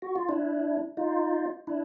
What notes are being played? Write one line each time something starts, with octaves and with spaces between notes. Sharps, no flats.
F#4
F4
D4 E4
D#4 F4
D4 E4